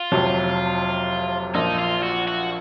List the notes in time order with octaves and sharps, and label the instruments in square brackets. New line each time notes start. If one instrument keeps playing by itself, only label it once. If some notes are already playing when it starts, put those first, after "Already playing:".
Already playing: [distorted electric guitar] F4
[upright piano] F1 F2 C3 F#3
[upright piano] A#1 A#2 F3 A#3 [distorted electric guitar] D#4
[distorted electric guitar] F4
F#4
F#4